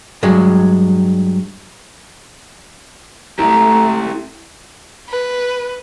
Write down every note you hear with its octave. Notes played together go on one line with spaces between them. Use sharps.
G2 F#3 G#3
A3 E4 G4 A#5
B4